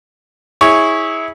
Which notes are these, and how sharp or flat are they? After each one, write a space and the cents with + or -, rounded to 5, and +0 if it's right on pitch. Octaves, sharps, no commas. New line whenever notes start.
E4 -20 G#4 -5 C#5 +0